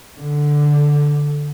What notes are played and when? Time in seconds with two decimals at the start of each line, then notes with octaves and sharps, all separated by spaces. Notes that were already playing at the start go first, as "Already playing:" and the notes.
0.20 D3